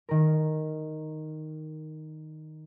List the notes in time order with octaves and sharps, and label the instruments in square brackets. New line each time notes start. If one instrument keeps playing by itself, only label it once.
[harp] D#3 A#4